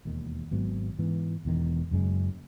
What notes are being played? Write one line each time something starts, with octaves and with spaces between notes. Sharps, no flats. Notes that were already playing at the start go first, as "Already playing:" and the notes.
E1 D#2 D#3
G#1 G#2 F#3 B3
G#2 E3 B3
E1 E2 D#3
F#1 F#2 C#3 G#3